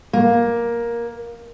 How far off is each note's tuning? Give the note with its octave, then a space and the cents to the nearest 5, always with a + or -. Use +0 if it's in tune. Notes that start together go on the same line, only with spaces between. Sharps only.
A#3 +10